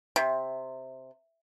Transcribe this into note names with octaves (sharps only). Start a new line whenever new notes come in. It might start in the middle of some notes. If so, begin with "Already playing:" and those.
C3